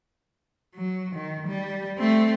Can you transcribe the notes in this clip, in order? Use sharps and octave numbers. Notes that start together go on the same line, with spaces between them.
F#3
D#3
G3
A3 C4